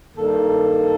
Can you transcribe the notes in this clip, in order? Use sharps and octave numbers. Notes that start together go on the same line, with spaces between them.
G2 D#3 A#3 D#4 A4